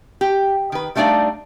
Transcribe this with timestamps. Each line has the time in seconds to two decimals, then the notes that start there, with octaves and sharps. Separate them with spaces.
0.21 G4
0.72 D#3 B4
0.96 G3 A3 D4 D#4 D5 F5